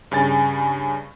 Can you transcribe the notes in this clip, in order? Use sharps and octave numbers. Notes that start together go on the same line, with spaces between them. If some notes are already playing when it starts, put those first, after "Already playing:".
G2 C#3 G#5 A6